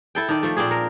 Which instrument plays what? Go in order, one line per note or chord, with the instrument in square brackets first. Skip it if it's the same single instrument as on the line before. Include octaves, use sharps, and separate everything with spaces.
[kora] E4 A4 G5
D#3 D4
F3 A3
A#2 C4 D4 G#4
A#4